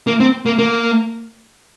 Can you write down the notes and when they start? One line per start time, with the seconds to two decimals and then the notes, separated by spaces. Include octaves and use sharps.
0.07 A#3
0.20 C4
0.46 A#3
0.59 A#3